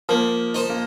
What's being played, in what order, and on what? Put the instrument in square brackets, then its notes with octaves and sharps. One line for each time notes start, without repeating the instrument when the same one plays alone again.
[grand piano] F3 [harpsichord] A#3
[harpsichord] D#4 C5
[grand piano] A#3